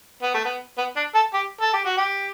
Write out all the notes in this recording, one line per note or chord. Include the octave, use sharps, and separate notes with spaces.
B3
A3
B3
B3
D4
A4
G4
A4
G4
F#4
G4